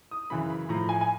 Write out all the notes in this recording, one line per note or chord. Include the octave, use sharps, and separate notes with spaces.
D#6
F#2 C#3 E3 B5
B5
A2 F3 A#5
G#5
G#5